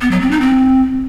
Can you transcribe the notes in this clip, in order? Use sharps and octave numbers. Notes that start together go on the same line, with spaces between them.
B3
F#3
C4
D#4
C4